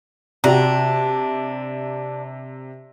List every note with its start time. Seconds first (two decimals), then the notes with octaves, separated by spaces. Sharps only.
0.44 C3 D4 F#4 G4 A#5